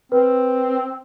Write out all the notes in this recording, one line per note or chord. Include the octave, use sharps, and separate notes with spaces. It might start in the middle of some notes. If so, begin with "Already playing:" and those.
C4 B4